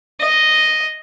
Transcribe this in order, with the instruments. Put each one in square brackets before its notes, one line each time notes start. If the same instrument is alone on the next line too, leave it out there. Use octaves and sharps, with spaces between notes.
[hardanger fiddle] D#5